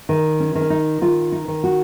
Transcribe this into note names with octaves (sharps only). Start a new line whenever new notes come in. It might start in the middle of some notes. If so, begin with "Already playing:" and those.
D#3
C#4
D#3
C#4
D#4
D#3 F4
D#4
D#3
F#4